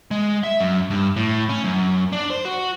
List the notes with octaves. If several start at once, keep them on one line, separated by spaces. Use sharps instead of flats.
G#3
E5
F#2
G2
A2
C#4
F#2
D4
C5
F#4